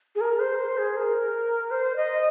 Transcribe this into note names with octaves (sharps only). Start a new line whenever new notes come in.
G#4
A#4
C5
C5
G#4
A#4
C5
D#5